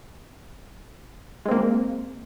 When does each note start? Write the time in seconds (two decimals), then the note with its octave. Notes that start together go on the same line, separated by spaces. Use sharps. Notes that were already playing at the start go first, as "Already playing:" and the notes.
1.46 G#3
1.48 C4
1.51 A#3